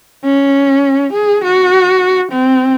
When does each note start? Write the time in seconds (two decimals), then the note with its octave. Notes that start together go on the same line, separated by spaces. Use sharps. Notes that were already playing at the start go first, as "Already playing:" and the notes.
0.24 C#4
1.13 G#4
1.45 F#4
2.32 C4